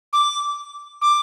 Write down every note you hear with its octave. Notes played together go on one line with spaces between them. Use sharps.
D6
D6